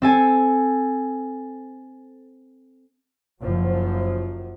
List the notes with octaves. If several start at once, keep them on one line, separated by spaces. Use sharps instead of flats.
C4 A4 G#5
F#1 F#2 F3 F#3